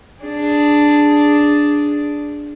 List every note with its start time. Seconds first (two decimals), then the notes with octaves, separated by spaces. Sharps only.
0.22 D4 G#4